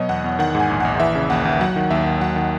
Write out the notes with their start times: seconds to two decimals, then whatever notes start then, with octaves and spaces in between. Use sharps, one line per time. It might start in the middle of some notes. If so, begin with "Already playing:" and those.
Already playing: B2 F#3 C#5 D#5
0.09 E2 F#5
0.24 E2
0.39 D#3 F#5
0.55 G#2
0.60 G#5
0.69 A#1
0.80 A#1 F#5
1.00 E3 E5
1.15 C#3
1.30 D#2 F#5
1.45 D#2
1.60 F#3 F#5
1.76 D#3
1.90 D#2 E5
2.06 D#2
2.21 F#3 F#5
2.36 D#3